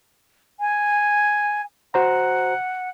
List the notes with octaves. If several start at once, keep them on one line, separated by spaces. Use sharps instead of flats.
G#5
F#4 C5 F#5 A#5